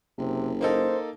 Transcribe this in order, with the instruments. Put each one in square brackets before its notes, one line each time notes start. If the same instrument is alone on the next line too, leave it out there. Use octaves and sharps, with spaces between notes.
[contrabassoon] F#1 [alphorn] C3
[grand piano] A#3 D#4 A4 [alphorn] C5